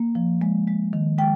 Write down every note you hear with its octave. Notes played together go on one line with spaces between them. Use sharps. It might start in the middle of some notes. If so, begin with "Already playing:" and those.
Already playing: A#3
F3
G#3
G#3
D#3
G#3 G5